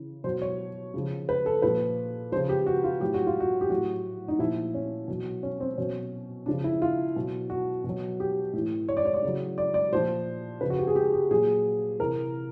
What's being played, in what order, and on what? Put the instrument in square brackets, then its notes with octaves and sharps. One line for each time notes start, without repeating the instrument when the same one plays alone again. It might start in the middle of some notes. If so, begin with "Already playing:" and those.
Already playing: [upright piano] C#3 E3
B2 F#3 C5
C#5
C#3 F3
B4
A4
A#2 F3 B4
F3 C5
C#3
G4
F#4
F4
A2 F#3 G4
F#4
F4
F#4
G4
A2 F#3 F#4
D#4
A#2 F3 E4
C#4
B2 F#3
C#4
C4
B2 F#3 C#4
C#3 F3 D4
E4
F4
B2 F#3
F#4
B2 F#3
G4
A2 E3
C#5
D5
C#5
D5
C#3 F#3
D5
D5
A#2 F3 C5
C#3 F3 B4
F#4
G4
G#4
G4
G4
A#2 F#3 G#4
C3 E3 A#4